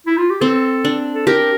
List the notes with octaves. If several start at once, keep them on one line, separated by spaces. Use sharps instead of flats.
E4
F4
G4
C4 A4
D4
A4
G4 A#4